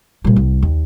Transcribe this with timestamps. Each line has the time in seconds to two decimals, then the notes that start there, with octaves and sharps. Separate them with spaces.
0.24 A#2 G3
0.36 C2
0.63 D#2